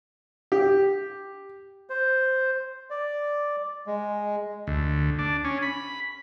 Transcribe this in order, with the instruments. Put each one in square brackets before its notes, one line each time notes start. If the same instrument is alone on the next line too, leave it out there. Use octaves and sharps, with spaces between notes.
[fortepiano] G4
[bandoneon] C5
D5
G#3
[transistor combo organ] D2
D4
C#4
B5